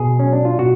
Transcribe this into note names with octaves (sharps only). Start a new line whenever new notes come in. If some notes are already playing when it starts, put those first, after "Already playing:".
Already playing: B2 G#4
F#3 C#4
D4
F4
B2 F#4